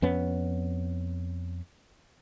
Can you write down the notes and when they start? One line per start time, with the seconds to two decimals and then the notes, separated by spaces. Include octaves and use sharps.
0.02 F2 B3 C#4